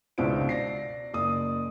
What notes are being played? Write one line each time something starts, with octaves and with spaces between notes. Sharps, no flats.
C#2 B2 D4 E4 C5 D7
D5 A#6 C7
F#1 D5 D#6